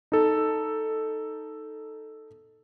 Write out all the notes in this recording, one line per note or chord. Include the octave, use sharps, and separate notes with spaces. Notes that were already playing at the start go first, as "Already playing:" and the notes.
D#4 A4